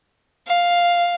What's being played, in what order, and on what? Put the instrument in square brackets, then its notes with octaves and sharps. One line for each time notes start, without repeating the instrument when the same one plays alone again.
[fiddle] F5